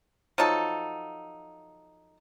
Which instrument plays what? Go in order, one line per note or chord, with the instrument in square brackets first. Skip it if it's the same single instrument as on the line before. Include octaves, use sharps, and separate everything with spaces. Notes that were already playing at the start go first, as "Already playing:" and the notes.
[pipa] F3 F#3 D#4 A4